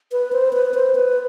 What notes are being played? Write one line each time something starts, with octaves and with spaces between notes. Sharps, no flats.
B4
C5
B4
C5
B4